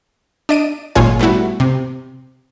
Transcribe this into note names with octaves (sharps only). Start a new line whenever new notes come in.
D4 D#5 D7 D#7
G#1 A#2 F#3 F4 C#5 G#5
G3 A3 B3 E4 F#4
C3